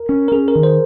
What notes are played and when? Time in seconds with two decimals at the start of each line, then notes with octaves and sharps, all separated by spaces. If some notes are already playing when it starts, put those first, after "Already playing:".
Already playing: A#4
0.09 C#4
0.28 A#4
0.32 C#4 G#4
0.48 A#4
0.55 D#3
0.63 C5